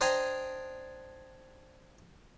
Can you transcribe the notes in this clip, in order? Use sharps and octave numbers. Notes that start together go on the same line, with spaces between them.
D4 C5 D#5 G5 G#5 A#5